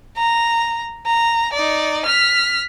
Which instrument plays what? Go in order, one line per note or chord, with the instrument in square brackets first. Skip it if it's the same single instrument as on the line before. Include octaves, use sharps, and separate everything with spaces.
[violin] A#5
A#5
D#4 D5
F6 B6